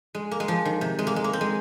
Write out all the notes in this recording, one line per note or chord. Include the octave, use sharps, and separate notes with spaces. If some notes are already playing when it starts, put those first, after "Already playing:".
G#3
A#3
G#3
F3
D#3
C3
G#3
A#3
G#3
A#3
C4
G#3